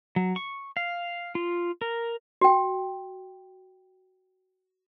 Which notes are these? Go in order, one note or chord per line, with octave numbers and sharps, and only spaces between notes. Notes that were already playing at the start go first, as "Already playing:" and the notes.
F#3
C#6
F5
F4
A#4
F#4 G5